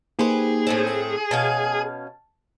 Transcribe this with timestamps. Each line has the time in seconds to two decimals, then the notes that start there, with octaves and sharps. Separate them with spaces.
0.19 A#3 D#4 G4 G#4 B4 C5
0.67 A2 A3 C4
0.87 G#5
1.31 B2 C#4 F5 A5